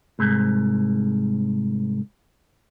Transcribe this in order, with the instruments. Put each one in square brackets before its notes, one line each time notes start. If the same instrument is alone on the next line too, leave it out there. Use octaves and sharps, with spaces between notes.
[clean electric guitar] C2 G#2